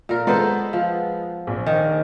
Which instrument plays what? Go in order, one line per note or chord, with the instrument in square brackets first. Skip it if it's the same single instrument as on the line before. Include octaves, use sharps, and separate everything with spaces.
[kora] A#2 A#4
[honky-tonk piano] G#3 B3 [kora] A4 C5
[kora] F3
[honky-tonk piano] A#1
[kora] D#3